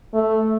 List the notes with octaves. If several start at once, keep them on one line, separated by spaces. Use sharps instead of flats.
A3